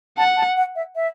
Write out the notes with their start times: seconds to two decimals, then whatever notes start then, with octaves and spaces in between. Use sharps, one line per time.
0.17 F#5 A5
0.37 A5
0.57 F#5
0.76 E5
0.96 E5